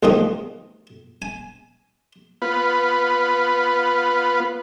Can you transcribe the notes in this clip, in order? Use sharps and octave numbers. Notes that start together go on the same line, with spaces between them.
A1 E2 D#3 F3 D#4 C#6
G#5
B3 F4 B4